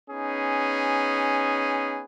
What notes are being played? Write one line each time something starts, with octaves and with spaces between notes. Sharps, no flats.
B3 C#4 D#4 G#4